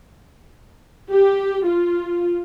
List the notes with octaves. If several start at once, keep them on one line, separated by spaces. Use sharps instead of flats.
G4
F4